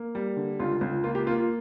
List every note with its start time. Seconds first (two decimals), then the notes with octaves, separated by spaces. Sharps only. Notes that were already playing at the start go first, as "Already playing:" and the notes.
Already playing: A#3
0.15 G3
0.37 D3
0.60 C#2 F4
0.81 C#2
1.04 A#3 F4
1.15 G4
1.27 A#3 F4
1.38 F4